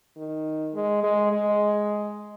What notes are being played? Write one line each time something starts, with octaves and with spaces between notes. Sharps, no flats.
D#3
G#3
G#3
G#3